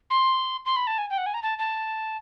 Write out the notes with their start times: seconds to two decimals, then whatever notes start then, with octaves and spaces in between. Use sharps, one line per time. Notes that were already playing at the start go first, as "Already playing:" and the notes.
0.10 C6
0.65 C6
0.76 B5
0.87 A5
0.98 G#5
1.10 G5
1.18 F#5
1.26 G#5
1.34 A#5
1.43 A5
1.59 A5